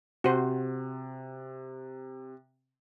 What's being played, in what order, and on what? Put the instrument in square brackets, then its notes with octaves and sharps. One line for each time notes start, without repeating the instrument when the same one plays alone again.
[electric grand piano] C3 [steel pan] F#4 C5